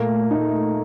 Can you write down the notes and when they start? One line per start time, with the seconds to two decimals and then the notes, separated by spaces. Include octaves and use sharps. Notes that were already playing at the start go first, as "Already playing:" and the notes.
Already playing: A#2 A3 A#3
0.31 D#4